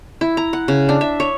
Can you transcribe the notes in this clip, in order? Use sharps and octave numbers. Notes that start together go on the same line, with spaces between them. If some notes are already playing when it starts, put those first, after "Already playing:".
E4
A#5
F#5
C#3
D4
E5
C#5